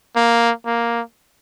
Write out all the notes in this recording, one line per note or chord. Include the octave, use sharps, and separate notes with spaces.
A#3
A#3